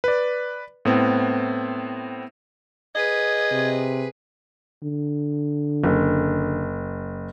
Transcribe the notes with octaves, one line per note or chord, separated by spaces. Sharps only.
B4 D5
A2 B3 C4
G#4 B4 D#5 G#6
C3
D3
F#1